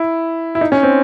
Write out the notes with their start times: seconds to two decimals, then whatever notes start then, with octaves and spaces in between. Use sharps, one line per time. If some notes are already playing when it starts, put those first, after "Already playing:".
Already playing: E4
0.55 E4
0.61 D#4
0.72 C#4
0.83 C4